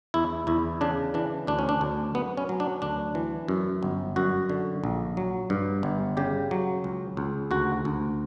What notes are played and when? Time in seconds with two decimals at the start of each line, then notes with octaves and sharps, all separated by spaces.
0.14 E2 E4
0.47 E2 E4
0.81 C#3 D4
1.14 E3 D4
1.47 D2 D4
1.59 C#4
1.69 D4
1.81 D2
2.15 F#2 B3
2.37 C#4
2.49 F#3
2.60 D4
2.82 D2 D4
3.15 E3
3.48 F#2
3.83 G1
4.16 F#2 F#4
4.50 D3
4.84 A#1
5.17 F#3
5.50 G2
5.83 G1
6.17 C#3 G4
6.51 F#3
6.84 C#2
7.17 C#2
7.51 D2 F#4
7.85 D2